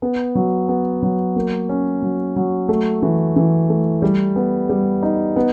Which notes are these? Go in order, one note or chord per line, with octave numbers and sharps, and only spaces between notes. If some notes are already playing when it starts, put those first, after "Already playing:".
B3
F#3
B3
F#3
A#3
C#4
F#3
F#3
A3
E3
E3
A3
G3
B3
G3
D#4
B3